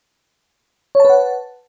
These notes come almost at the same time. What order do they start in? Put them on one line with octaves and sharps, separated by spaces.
C#5 A5 B4 F#5